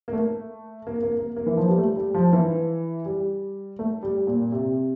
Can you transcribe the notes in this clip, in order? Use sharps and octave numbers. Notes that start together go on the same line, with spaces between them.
A#3
A3
A#3
A#3
A#3
A#3
E3
F3
G3
A3
G3
F3
E3
G3
A3
G3
A#2
C3